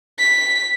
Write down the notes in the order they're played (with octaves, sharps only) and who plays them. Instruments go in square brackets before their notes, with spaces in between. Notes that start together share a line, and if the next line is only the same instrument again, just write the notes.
[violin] B6